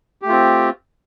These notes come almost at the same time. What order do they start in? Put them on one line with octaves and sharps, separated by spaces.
G4 A3 F4 C4